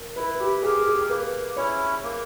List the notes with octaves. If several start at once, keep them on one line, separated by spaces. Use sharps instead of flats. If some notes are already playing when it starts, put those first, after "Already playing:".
Already playing: A#4
E4 B4
G4
G4 G#4 A#4
G#4
A#3 B4
C#4 E4 C#5
A#3